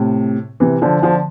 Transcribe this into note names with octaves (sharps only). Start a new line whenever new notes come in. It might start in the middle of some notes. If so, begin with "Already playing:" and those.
Already playing: A2 C3
C3 E3
D3 F3
D3 F3